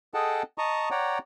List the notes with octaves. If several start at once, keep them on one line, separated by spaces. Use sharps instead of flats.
G#4 A4 D#5 F#5 G5 A5
D#5 A5 A#5 C#6 D#6
C#5 D5 F#5 G5 A#5